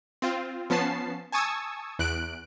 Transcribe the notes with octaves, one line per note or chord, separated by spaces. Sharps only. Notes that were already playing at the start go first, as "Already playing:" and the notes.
C4 F4
F3 B3 C#4 A5 C7
G#5 A5 C#6 D#6 E6 G#6
E2 F#6 D7